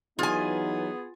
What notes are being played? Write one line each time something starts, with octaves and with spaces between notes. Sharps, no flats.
E3 F#3 B3 D#4 F4 G#4 G#5